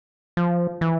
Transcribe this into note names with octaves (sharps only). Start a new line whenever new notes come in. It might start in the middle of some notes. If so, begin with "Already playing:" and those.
F3
E3